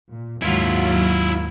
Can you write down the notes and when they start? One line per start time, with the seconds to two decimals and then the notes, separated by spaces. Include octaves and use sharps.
0.10 A#2
0.42 D#2 G#2 F#3 E4 F4